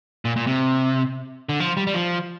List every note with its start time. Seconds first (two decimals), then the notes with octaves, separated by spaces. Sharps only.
0.25 A#2
0.36 A#2
0.47 C3
1.49 D3
1.60 F3
1.77 G3
1.87 G3
1.94 F3